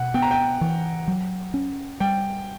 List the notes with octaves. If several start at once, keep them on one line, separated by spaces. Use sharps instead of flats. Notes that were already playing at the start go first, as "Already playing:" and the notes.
Already playing: B2 F#5
B3 G5
A#5
G5
E3
F#3
C#4
G3 G5